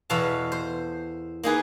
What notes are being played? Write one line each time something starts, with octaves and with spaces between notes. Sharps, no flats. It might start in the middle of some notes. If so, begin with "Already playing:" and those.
E2 B2 A4 B4 F5 A5
C5
A#3 D#4 G#4 B4